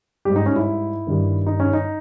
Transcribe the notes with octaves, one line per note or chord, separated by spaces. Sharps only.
G#2 G3 G4
D#4
C#4
E4
G2 D#3 G3
D#4
C#4
D#4